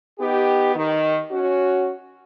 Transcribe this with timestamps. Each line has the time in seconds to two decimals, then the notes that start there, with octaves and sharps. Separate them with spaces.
0.19 B3 D#4 G4
0.76 D#3
1.31 C#4 F#4